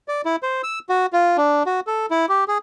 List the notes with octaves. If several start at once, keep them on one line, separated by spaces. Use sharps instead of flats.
D5
E4
C5
E6
F#4
F4
D4
F#4
A4
E4
G4
G#4